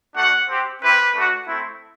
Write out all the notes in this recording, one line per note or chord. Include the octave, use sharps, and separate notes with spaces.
A3 D4 F#4 F#5
C4 G4
C4 E4 G4 B4
A3 D4 F#4
A3 C4 E4